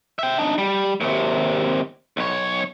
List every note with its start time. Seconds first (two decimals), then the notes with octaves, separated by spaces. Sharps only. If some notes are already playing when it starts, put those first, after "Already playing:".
0.19 E5 G5
0.39 D4 D#4
0.58 G3
1.01 D#2 C3
2.17 B1 C#5